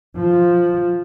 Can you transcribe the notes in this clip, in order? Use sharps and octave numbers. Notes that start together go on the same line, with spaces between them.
F3